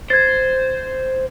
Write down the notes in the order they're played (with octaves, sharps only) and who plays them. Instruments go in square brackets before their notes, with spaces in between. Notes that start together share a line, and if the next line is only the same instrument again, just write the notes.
[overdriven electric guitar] C5 [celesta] G#6 A6